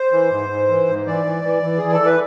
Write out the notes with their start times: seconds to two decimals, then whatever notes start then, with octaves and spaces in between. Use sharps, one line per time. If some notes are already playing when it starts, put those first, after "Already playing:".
Already playing: C5
0.12 E3
0.31 G#2
0.49 G#2
0.69 E3
0.88 G#2
1.07 E3 D5
1.25 E3
1.44 E3
1.62 E3
1.78 E3 G#4
1.92 A4
2.00 E3
2.06 B4